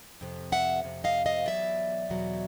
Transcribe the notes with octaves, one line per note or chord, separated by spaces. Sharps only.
F2 C3
E5 F#5
F2 C3
D#5 F5
D#5 F5
E2 B2 F#3 D5 E5
E2 B2 F#3